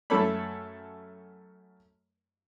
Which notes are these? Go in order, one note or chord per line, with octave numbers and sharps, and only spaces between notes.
F#2 A3 A4 C#5 B5